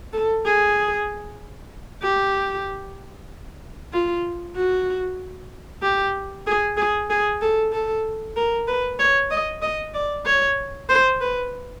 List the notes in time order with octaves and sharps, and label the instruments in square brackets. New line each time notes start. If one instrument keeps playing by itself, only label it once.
[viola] A4
G#4
G4
F4
F#4
G4
G#4
G#4
G#4
A4
A4
A#4
B4
C#5
D#5
D#5
D5
C#5
C5
B4